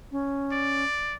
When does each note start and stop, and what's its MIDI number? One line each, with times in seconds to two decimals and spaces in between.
0.12 0.84 61
0.52 1.14 74